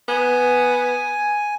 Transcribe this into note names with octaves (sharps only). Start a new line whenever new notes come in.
B3 G#5